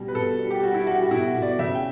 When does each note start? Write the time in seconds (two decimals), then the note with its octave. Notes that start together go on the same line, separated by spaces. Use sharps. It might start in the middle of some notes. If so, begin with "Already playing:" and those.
Already playing: B2 G3
0.08 B4
0.15 B2 A4
0.39 G3
0.51 G4
0.63 G3 F#4
0.74 E4
0.87 G3 F#4
0.99 F#4
1.11 B2 E4
1.27 F#4
1.35 B2
1.42 D5
1.59 C#3 E5
1.75 G5